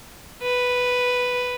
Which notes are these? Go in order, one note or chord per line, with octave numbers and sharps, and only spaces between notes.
B4